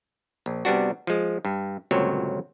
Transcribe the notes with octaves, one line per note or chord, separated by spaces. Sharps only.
A#1
C3 G3 B3 D4 F#4
F3 G#3
G2
G1 C#2 A#2 F#3 C4 C#5